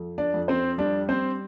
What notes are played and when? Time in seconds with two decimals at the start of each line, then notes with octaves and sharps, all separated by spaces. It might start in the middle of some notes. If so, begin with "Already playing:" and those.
Already playing: F2
0.18 D4 D5
0.34 F2
0.48 C4 C5
0.78 G3 D4 D5
1.09 C4 C5